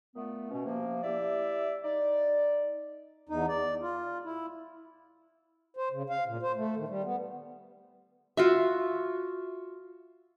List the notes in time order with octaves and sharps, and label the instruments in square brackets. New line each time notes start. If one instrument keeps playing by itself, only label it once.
[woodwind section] A#2 A3 B3
B2 C#4
C3 F3 A#3
E4 G4 D5 E5
D#4 D5
[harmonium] E2 D#4
D5
F4
E4
C5
C#3
F5
A#2
C5
A3
D#3
G3
B3
[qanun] F4 F#4 E5